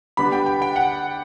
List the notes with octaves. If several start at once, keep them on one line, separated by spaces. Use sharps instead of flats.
D3 G3 B3 D4 B5
G5
G5
G5
F#5